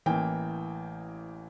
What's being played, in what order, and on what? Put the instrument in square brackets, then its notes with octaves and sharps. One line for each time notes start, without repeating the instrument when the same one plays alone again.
[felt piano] A1 E3 A#3 G5